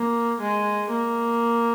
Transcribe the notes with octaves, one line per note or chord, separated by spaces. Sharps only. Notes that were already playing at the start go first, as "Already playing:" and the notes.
Already playing: A#3
G#3
A#3